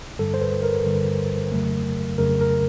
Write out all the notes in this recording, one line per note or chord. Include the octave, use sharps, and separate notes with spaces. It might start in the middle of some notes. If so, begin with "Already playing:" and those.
G2 D3 G3 A4
C5
B4
A#4
G2 D3 G3
F2 C#3 F#3 A3
F2 C#3 F#3 A3 A#4
A#4